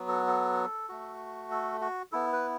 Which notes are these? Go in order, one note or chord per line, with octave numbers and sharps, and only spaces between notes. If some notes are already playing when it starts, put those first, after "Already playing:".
Already playing: F#3 B3
A4
A4
A3 F#4
A4
F#4
B3 E4 A4
B4